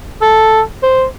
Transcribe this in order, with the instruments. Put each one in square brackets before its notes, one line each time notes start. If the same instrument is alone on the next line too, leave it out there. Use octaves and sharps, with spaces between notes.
[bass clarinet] A4
C5